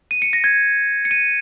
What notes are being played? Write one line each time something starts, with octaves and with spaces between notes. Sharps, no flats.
D#7
C#7
A#6
G#6
C#7
D#7